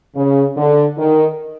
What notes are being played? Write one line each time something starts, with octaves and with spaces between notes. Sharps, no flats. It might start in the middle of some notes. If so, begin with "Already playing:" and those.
C#3
D3
D#3